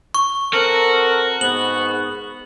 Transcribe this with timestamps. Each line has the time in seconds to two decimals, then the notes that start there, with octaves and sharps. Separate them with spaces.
0.14 C#6
0.53 C4 F#4 A4 A#4
1.41 G#2 B3 F#7